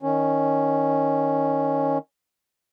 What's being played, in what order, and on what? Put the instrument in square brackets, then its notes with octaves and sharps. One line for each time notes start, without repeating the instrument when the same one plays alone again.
[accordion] D#3 C#4